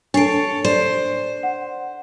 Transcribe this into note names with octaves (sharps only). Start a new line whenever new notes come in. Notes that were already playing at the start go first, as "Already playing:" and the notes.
D4 A4 C#5 A6 C7 D7
C5 D5
F#5